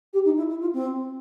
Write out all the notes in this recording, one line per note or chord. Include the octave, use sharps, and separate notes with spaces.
G4
D#4
E4
E4
F4
C4